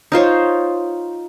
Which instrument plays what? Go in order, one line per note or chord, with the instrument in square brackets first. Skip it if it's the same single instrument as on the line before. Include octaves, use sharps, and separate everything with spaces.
[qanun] D#4 F4 C5 C#5